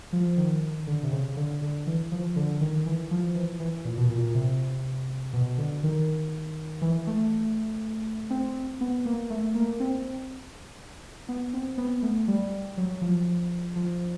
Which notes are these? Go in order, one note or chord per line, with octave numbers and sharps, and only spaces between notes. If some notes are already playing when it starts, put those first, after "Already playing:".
F3
D#3
D3
C3
C#3
D3
D3
E3
F3
D3
D#3
E3
F3
E3
E3
A#2
B2
A#2
A#2
C3
B2
D3
D#3
E3
A3
C4
B3
A#3
A3
A#3
C4
B3
C4
B3
A3
G3
F#3
F3
F3